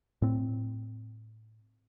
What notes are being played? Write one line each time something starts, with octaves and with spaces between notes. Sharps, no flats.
A2 C4